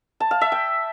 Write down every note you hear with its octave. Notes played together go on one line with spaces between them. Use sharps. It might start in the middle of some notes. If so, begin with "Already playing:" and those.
A5
F5
E5
G5